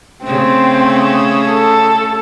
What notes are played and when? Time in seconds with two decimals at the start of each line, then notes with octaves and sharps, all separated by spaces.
0.24 C#3 A3 C4
1.48 A4